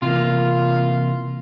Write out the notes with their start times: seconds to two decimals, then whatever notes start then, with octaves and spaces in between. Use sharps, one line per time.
0.02 C3 E3 A#3 F4